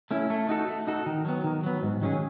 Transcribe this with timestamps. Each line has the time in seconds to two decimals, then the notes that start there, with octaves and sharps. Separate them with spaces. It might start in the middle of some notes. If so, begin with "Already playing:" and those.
0.11 A3 C#4 E4
0.30 A3
0.49 D#4 F#4 A4
0.68 A3
0.87 D#4 F#4 A4
1.06 D#3
1.25 F#3 B3
1.44 D#3
1.64 F#3 B3
1.82 G#2
2.01 D#3 F#3 C#4 G#4